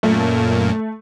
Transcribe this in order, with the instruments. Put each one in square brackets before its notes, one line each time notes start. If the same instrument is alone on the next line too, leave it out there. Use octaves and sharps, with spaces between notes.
[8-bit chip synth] F#2 A#2 A#3 [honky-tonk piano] A3